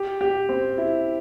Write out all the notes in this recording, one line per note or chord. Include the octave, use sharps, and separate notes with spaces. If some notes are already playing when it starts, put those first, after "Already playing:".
Already playing: G4
G4
C4
E4